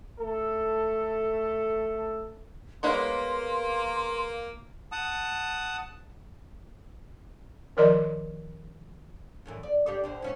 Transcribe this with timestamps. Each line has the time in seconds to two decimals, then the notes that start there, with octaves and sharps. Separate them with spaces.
0.18 A3 A4
2.83 G#3 A#3 B3 C#5 C6
4.92 F#5 A5 D#6
7.77 D#3 F3 A#4 D5 D#5 C6
9.46 F#2 A2 E3
9.63 D5
9.86 D4 G4 A4
10.04 B2 D3 C5
10.22 B2 C#4 E4